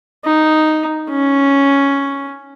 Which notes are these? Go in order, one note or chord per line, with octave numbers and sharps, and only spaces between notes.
D#4
C#4